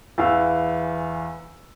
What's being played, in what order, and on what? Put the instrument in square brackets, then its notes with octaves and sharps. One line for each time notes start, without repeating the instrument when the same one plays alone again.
[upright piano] E2 E3 F5 E6